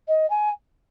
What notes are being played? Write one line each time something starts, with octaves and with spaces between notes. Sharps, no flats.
D#5
G#5